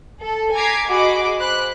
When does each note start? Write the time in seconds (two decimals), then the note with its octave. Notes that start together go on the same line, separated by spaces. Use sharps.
0.22 A4
0.54 G#5 A#5 D6 G#6 B6 C7
0.87 F#4 G#4 D#5 B5 D6
1.38 C5 B5 F#6